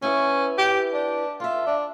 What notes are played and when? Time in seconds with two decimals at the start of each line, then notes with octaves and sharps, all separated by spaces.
0.02 B3 C#4 E4 B4
0.58 G4
0.93 D4
1.40 F4 A4 E5
1.67 D4